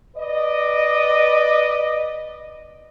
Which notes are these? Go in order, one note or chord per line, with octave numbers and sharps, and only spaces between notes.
B4 D5 D#5